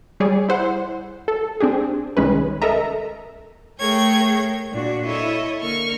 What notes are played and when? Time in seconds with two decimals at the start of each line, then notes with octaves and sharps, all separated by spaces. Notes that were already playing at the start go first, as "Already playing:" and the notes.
0.20 G3 G#4 C#5 D5
0.49 E4 C5 F#5
1.28 A4
1.61 C4 D4 G4 G#4
2.17 C2 D#3 G#3 C#4 B4
2.62 A4 A#4 D#5 E5 A#5
3.79 A3 G#4 A#4 C#5 G5 G#6
4.71 A#2 D4 F#4
5.06 E4 A4 C#5 D#5 E5
5.61 D3 A#3 C#6 F6